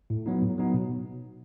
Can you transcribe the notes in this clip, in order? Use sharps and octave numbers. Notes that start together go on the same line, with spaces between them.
A2
F#3 B3 D#4
A2
F#3 B3 D#4
B2